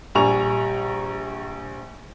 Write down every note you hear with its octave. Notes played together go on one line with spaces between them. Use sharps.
A#1 G3 G#5 A#5 C#6 F7